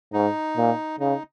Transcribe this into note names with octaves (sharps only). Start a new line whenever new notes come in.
G#2 D#4
A#2
C#3 D#4